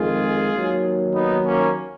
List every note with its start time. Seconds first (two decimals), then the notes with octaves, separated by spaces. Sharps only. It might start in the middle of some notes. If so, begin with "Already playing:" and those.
Already playing: F2 D#3 G#3 F4 G#4
0.52 D#2 D#3 F#3
1.14 B3 D#4
1.46 A#3 C#4